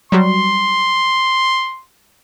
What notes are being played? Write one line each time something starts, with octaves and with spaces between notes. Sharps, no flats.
F#3 G3 F#4 C6